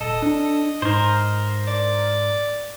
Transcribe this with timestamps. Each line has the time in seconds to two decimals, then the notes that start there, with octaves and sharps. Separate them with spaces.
0.01 D#1 A4 D#5
0.22 D4
0.82 G#2 A#4 C5
1.68 D5